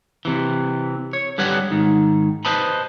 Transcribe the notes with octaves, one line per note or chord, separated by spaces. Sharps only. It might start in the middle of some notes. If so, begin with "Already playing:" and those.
C3 E3
C#5
D3 G3 B4 C#5 F#5
G#2 D#3
B4 C5 D#5 A5 B5